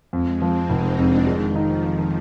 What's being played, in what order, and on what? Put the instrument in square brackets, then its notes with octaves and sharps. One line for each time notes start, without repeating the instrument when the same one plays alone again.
[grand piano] F2 [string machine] G#3
[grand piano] F3 [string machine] C4
[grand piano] F1 [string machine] D#4
[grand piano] F2 [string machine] D4
[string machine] D#3 [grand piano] G#3
[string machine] F3 [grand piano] D#4